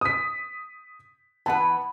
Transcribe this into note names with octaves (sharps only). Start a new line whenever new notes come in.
D#6 B6
E3 B3 B4 F#5 A5